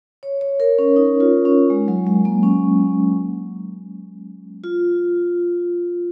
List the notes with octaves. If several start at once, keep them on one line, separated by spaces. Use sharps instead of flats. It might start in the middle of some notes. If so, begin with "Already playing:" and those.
C#5
C#5
A#4
C#4
D#4
F4
C#4
G#3
F#3
G#3
A#3
C#4
F4